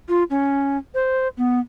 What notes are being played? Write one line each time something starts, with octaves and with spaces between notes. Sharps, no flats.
F4
C#4
C5
B3